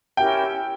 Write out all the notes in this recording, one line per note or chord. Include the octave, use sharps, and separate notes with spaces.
C#4 E4 G4 A#4 G5